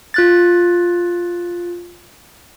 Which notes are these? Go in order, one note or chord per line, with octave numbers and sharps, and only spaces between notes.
F4 F#6 A6